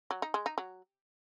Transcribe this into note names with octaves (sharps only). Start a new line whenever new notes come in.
F#3
D#4
G#3
D#4
F#3